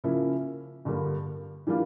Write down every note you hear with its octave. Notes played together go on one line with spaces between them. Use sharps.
C#3 F3 A#3 C#4 E4
G2 D3 G3 A#3
E3 G3 A#3 D4 F4